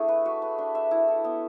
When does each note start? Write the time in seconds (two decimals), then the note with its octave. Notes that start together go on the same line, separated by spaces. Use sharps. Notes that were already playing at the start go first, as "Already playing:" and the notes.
Already playing: A3 D4 E4 G#4
0.08 B4
0.25 F#4
0.42 B4
0.58 D4
0.75 E5
0.91 E4
1.08 A4
1.24 B3